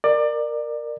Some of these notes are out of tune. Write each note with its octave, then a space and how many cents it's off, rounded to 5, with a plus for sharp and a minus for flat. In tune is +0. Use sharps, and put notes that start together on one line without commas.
A#4 +0 D5 +25